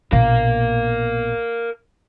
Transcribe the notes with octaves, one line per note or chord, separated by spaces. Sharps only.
A#1 B2 A#4 F5